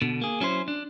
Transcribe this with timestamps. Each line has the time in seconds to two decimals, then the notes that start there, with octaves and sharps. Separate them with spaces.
0.02 B2 D3
0.22 A#3 G#4
0.40 F#3 C#4 E4 A4 C5
0.68 D4